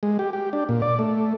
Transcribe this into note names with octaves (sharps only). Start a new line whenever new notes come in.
G#3
G4
G4
D4
A#2
D5
A3